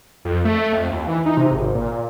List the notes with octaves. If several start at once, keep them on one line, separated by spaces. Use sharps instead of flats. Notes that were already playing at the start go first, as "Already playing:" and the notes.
F2
A3
F2
D#2
E3
D#4
C3
G#1
A#2